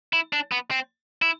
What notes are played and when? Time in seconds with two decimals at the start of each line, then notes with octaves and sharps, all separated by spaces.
0.13 E4
0.33 D4
0.52 B3
0.71 C4
1.22 E4